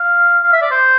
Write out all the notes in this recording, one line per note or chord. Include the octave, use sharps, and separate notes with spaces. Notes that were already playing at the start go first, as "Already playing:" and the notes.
Already playing: F5
F5
E5
D5
C5